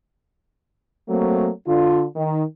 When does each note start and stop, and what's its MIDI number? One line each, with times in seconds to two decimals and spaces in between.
1.09 1.49 54
1.09 1.49 57
1.09 1.49 58
1.09 1.49 60
1.67 2.04 50
1.67 2.04 65
2.15 2.44 51